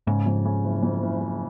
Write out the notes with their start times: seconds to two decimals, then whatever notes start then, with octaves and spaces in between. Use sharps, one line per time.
0.07 G#2 C#3
0.26 F2
0.45 C#3
0.64 F#1
0.83 F2
1.02 F#1
1.20 F#1